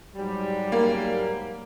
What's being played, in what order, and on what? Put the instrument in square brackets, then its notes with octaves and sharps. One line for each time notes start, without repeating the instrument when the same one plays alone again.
[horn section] G#2 F#3 G3
[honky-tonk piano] A#3